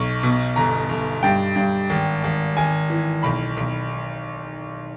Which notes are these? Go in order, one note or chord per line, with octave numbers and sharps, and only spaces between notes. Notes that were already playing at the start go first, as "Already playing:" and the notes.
Already playing: B1 C#6
B2
G1 A#5
G1
G2 G5
G2
G#1
G#1
G#1 G#5
E3
B1 B5
B1